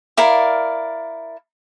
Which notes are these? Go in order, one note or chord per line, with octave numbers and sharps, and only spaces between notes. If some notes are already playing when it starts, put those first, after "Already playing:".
E4 A#4 D5 F5